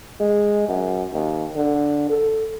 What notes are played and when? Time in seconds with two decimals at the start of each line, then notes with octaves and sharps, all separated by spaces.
0.20 G#3
0.69 F#2
1.13 D#2
1.56 D3
2.09 A4